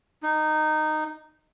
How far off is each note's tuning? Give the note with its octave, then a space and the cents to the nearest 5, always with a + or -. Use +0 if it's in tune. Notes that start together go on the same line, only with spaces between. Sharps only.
D#4 -15